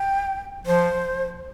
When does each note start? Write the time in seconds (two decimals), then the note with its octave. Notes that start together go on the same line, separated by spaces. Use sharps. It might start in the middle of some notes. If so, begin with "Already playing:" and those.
Already playing: G5
0.66 F3 C5